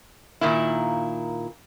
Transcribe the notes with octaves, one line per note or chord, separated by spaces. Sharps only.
A#2 D#3 A#3 E4